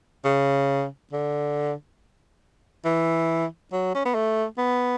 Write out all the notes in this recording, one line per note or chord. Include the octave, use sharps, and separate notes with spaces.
C#3
D3
E3
F#3
C#4
B3
A3
B3